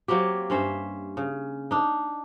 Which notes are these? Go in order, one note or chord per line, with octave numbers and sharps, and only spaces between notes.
F#3 A#3 C4 G4
G2 C#4 C5 E5
C#3
D4 D#4